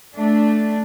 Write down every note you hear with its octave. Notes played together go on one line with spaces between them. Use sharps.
A3 D4